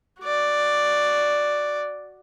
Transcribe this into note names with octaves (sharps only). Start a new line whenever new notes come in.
F#4 D5